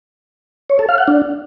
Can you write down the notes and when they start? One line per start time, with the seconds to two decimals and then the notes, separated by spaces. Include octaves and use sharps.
0.70 C#5
0.79 A4
0.89 F5
0.98 F#5
1.08 D4